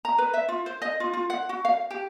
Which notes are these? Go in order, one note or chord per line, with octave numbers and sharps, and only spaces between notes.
A#5
B4
E5
F4
C5
D#5
F4
F4
F#5
F#4
F5
G4